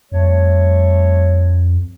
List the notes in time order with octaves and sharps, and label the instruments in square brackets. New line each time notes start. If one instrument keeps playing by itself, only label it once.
[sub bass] F2 [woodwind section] G3 A3 C#5